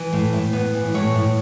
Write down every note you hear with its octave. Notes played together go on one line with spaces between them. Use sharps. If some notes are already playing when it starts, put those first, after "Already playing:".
Already playing: E3
A2
A2
B3
E3
A2 C#5
A2